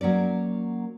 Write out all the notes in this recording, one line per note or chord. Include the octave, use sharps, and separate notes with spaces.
F#3 A#3 C#4 D5